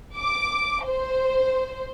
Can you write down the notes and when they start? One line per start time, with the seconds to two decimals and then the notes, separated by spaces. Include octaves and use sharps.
0.17 D6
0.86 C5